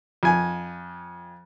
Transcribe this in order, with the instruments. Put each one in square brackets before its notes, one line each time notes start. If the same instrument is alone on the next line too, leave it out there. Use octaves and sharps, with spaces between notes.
[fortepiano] F2 G#5